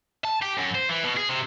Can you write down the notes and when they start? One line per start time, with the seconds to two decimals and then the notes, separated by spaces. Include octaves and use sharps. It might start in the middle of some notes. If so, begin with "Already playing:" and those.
0.24 A5
0.42 G4
0.58 F#2
0.75 C5
0.89 E3
1.04 B2
1.17 G#4
1.29 C3